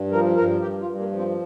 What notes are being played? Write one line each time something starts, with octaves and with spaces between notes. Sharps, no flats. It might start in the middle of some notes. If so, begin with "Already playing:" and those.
Already playing: G2
F3 A#4
G2 A#4
G2 G4
F4
G2
A#3
F3
C4